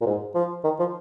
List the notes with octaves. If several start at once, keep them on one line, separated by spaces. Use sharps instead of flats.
A#2
G#2
F3
D#3
F3